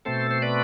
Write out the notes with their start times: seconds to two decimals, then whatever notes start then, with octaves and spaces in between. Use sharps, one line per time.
0.05 B2 A3 C4 A4 C5
0.31 C5
0.42 B4 D5